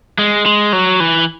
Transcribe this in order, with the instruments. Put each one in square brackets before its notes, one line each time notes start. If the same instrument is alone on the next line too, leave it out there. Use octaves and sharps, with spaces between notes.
[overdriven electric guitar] G#3
G#3
F#3
E3